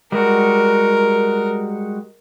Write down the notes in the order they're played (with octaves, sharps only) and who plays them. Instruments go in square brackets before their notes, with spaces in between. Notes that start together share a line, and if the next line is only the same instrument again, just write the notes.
[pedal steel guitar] G3 G#3 F#4 [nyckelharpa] A#4